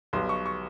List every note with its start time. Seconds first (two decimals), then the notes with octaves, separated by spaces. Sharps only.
0.13 B1 B2 G3 B3 C6
0.29 C#6
0.46 C#6